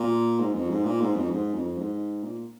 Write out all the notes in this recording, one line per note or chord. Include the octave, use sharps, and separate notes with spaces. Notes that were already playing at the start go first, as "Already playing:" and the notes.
Already playing: A#2
G#2
F2
G#2
A#2
G#2
F2
G#2
F2
G#2
A#2